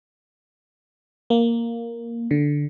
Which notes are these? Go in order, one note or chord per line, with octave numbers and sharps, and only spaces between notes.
A#3
D3